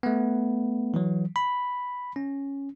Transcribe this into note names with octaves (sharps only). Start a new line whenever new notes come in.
A3 B3
E3 F#3
B5
C#4